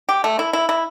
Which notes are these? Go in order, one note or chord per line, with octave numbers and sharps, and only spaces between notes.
G4
A3
E4
E4
E4